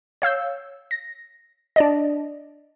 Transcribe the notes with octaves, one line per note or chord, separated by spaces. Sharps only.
C#5 F5 E6 G6
A#6
D4 D5 D#5